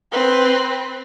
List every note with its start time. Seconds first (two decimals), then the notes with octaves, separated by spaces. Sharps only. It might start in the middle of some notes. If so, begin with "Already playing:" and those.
0.12 C4 B4